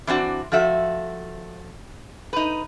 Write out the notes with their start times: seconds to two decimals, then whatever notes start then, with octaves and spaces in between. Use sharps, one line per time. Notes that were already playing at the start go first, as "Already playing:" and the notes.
0.07 E3 C4 D4 F#4
0.52 F3 A3 F#4 E5
2.33 D#4 B4